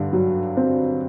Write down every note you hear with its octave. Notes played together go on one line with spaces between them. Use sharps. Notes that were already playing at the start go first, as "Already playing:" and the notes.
Already playing: G2 D3
F#3
C4